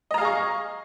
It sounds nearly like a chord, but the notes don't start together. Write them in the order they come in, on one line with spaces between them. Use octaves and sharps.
D#5 A#5 F5 G#4 C#6